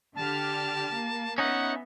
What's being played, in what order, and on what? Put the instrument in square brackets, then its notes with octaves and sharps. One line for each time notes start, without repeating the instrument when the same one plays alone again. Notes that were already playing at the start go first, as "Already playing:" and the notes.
[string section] D3 G4 F6 [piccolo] A5
[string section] A#3
[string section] B3 E5 [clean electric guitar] C#4 D#4 [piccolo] F#5